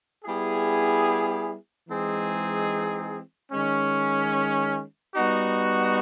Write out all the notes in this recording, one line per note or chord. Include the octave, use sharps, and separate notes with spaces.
G3 B3 E4 G#4
E3 G#3 C4 D#4 G#4
D#3 G#3 C#4
G3 B3 D#4 F#4